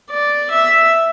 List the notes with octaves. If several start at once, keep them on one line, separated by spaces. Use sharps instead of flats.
D5
E5